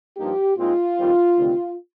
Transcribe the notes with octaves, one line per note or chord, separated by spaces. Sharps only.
G2 F3 A#3 D#4 G4
A#2 G#3 C4 D#4 F4
F2 D#3 G3 C4
D2 C3 D#3 G3 C4